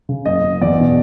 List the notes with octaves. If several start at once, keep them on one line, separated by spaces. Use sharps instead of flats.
C#3
F#1 D#5
F#1
E2 D5
B2